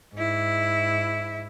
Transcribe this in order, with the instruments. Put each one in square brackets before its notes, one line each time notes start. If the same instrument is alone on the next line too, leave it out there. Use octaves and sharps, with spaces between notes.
[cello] G#2 E4